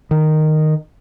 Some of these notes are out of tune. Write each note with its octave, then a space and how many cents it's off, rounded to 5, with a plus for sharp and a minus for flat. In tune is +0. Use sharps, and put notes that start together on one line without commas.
D#3 -10